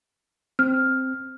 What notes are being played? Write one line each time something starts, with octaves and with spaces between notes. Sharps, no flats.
C4 F6